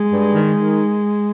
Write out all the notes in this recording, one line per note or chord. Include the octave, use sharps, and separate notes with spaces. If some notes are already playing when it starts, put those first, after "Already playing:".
Already playing: G#3
G2
D#3
D#3